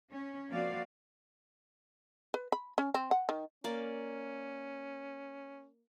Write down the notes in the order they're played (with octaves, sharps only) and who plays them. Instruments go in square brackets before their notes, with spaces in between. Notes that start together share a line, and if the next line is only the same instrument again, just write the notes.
[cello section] C#4
F3 A#3 C4 F#4 D5 F5
[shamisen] B4
B5
C#4
C4
F#5
D#3
[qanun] A#3 D5 [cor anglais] C#4